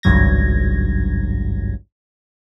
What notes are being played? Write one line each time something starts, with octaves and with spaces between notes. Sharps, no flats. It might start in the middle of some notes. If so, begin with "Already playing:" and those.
G#1 C#2 G2 F#3 G#6 A#6